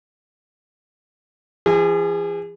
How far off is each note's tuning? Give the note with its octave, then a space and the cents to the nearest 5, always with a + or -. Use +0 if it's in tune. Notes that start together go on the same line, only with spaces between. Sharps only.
E3 +45 G#4 -30